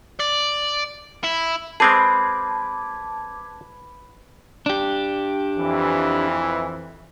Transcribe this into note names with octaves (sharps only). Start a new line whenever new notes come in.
D5
E4
G#3 C4 G#4 B4 A5 D6 G#6
D4 G4
F2 E3